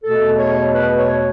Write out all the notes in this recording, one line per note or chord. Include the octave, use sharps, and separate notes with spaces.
E2 B2 A3 A4
C#5
B4
C#5